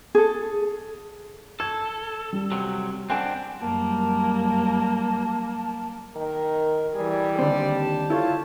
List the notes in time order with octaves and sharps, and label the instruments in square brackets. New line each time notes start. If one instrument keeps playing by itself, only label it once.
[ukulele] G#4 A4
[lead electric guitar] A4 [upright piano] G#6
[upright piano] G3
[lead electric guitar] C3 F#3
[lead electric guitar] C4 D4 [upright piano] F#5 G#5 F#6
[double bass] F#2 G3 [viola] A#3 [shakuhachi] A5
[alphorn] D#3 [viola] A#4
[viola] E3 G#4 [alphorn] G3
[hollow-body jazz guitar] D#2 D3 C4 [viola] D5
[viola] G4 A5
[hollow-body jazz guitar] E4 A4 C#5 [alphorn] F4